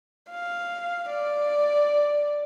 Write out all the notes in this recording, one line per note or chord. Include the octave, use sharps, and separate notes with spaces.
F5
D5